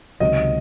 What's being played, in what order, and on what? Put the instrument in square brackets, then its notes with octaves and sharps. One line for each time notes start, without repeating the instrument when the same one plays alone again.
[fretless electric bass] C#2 C3 D#3 F#3 [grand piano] D#5